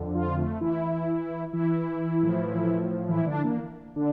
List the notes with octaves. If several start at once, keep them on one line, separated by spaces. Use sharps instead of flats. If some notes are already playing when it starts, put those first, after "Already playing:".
Already playing: F2 D3
F3 F4
A3
E3 E4
E3 E4
A2 F3
E3 E4
D3 D4
A#3
D3 D4